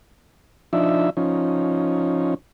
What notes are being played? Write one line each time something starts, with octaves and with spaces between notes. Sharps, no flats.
F3 D4 D#4 E5
F3 C#4 D#4